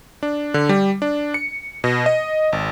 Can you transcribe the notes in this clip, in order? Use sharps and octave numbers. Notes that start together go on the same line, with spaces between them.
D4
D3
G3
D4
C#7
B2
D#5
G#1